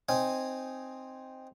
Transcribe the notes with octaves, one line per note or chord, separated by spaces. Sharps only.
C4 D#4 G#5